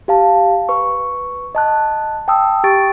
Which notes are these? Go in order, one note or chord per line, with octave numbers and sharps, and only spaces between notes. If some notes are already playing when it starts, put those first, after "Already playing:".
G4 F5 A5
B4 C#6
D#5 A5 F#6
G5 A5 D#6 E6
G4 G5 C#6 A6 D7